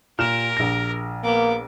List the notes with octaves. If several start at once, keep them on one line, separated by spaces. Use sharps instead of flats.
A#2 G4 A#4 F6 E7
A#1 A#6
A#3 B3 D6